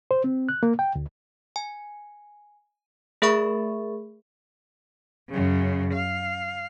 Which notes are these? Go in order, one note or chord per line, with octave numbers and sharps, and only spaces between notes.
C5
C4
F#6
A#3
G5
D2
G#5
A3 G#4 A#4 E5 B5 C#6
F#2 C#3
F5